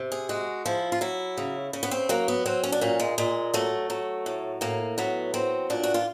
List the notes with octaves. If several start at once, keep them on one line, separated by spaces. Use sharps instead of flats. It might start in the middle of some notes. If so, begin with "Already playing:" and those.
Already playing: C3
G#4
G#3 F#4
F3 E4
F4
F#3 E4
C#3
C#3
B3
C4
F#3 A#3
B3
F#3 C4
C#4
D4
A#2 C#4
G#3
A#2 G#3
F#3 A3
F#3
A2
A2 A#3
F#3 B3
F#3 C4
A#2 D4
F#4
F4